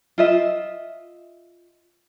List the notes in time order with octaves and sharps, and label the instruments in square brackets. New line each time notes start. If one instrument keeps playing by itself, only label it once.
[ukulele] F4 D#5 E5